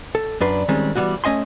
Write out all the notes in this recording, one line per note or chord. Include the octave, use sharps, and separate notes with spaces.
A4
F#2 D4 B4 C6
D#3 G3 G#3 C4 C#4
E3 F#3 G3 B3 F#4
A3 C#4 D#5 G#5 C6